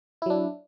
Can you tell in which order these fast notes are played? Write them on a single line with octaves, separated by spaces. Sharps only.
E4 F#3 D4